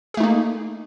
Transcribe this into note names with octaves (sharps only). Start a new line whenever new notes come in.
A3 A#3 D#4 G#4